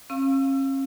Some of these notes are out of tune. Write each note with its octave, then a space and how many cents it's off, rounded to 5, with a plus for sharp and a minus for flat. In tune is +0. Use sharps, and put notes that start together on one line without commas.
C#4 -40 F5 +0 E6 +30